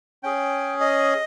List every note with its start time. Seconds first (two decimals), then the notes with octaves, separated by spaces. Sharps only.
0.23 C#4 G#4 G5
0.80 D#5